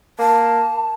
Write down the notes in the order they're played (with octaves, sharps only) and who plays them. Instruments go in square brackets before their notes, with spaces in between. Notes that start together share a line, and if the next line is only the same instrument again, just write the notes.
[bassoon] A#3 [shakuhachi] A5